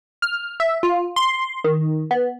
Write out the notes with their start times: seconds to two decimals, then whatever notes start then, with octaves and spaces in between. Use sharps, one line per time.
0.22 F6
0.60 E5
0.83 F4
1.16 C6
1.64 D#3
2.11 B3